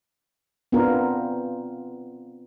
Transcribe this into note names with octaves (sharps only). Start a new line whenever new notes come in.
B3 C4 D4 F4 A#4